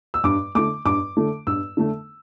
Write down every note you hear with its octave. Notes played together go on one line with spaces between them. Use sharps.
E6
G2 D6
D3 A3 D6
G2 D6
D3 A3
G2 E6
D3 A3